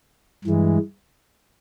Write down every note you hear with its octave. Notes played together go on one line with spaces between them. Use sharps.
G2 E3 G#3